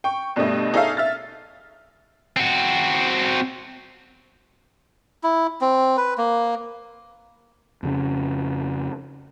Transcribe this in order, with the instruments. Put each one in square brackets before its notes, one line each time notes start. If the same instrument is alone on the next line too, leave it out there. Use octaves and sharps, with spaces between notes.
[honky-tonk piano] G5 C#6
G2 B2 G3 A3 D#5
D#4 G#4 A4 C#5 E5 F5
E5 F6 A6
[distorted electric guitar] C4 F#4
[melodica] E4
C4
B4
A#3
[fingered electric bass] F2 C#3 C#4